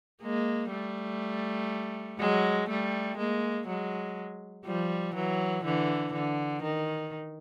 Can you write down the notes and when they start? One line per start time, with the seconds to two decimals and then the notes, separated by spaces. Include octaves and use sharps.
0.23 G#3 A#3
0.71 G3 A3
2.19 F#3 G#3
2.69 G3 A3
3.18 G#3 A#3
3.67 F#3 G#3
4.65 F3 G3
5.15 E3 F#3
5.65 D3 E3
6.13 D3
6.63 D#3